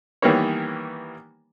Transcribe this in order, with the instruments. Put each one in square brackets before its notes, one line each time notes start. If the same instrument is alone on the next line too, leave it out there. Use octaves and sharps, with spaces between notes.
[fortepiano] D#3 E3 G3 A#3 B3 C#5